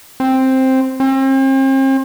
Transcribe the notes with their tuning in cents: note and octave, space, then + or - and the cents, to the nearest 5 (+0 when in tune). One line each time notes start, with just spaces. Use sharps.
C4 +5
C4 +40